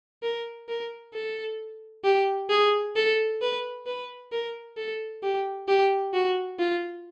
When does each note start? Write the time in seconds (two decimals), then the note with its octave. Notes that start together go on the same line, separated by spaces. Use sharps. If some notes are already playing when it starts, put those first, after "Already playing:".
0.23 A#4
0.69 A#4
1.14 A4
2.04 G4
2.50 G#4
2.96 A4
3.41 B4
3.86 B4
4.32 A#4
4.77 A4
5.23 G4
5.68 G4
6.14 F#4
6.59 F4